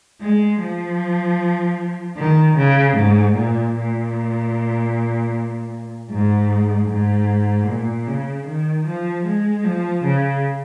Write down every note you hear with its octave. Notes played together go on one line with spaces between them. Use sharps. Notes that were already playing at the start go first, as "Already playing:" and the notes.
G#3
F3
D#3
C#3
G#2
A#2
A#2
G#2
G#2
A#2
C#3
D#3
F3
G#3
F3
C#3